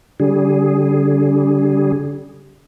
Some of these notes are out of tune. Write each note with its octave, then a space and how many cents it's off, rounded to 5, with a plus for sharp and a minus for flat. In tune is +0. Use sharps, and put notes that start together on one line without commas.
D3 -40 G3 -20 G#4 +0